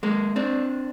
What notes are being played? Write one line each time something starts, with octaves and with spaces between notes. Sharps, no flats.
G#3 A#3
C4 D4